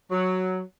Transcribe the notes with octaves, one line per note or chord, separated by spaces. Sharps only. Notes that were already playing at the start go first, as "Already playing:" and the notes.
F#3